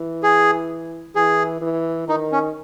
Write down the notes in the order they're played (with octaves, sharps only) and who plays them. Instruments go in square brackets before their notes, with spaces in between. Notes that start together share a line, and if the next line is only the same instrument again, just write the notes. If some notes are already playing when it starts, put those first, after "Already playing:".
Already playing: [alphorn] E3
[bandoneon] G#4
[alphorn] E3 [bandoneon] G#4
[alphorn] E3
[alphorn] D#3 [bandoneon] D#4
[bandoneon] C#4